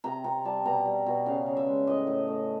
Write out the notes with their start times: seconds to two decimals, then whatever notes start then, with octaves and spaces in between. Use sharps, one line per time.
0.04 C3 A#5
0.24 C3 A#5
0.45 G3 A5
0.65 B2 A#5
0.85 G3
1.06 B2
1.26 C#3 F5
1.46 C#3
1.57 E5
1.67 G#3
1.87 A2 D#5
2.07 A2
2.28 A3